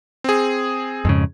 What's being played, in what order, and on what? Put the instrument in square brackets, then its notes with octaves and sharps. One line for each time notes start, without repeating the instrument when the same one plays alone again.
[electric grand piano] C4 G#4
[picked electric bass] F2 G#2 C#3